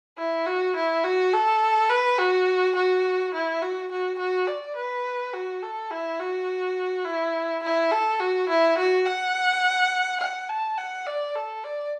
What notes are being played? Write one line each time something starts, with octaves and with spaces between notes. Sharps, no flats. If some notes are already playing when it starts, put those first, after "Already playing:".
E4
F#4
E4
F#4
A4
B4
F#4
F#4
E4
F#4
F#4
F#4
D5
B4
F#4
A4
E4
F#4
E4
E4
A4
F#4
E4
F#4
F#5
F#5
A5
F#5
D5
A4
D5